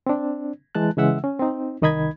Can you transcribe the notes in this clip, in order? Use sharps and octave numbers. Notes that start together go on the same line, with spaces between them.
C4 D4
E3 G#3 A5 F#6
C#3 E3 G#3 E5 F#5 E6
C#4
C4 D#4
C2 D#3 D#4 D#5 B5 G#6